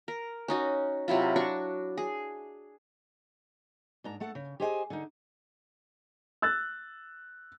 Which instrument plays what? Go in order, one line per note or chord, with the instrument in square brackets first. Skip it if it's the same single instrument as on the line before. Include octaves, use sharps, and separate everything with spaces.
[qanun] A#4
C#4 D#4 F#4
C3 F#3 E4 F4
D4 F#4 C#6
G#4
[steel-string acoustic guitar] G#2 D4 A#5
A3 A4 F#5
C#3
G4 G#4 C5 D#5 F#5 G#5
D3 D#4
[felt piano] E6 F#6 A6